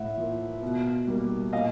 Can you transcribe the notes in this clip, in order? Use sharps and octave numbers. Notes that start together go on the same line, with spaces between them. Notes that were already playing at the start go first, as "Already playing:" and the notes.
Already playing: A2 E5 F#5
F3 A#3
B2
G3 A#3
A#2 D#5 F5